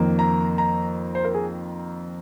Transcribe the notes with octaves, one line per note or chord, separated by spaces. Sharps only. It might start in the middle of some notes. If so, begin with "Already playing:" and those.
Already playing: F2 D#3 A#3
A#5
A#5
C5
A#4
G#4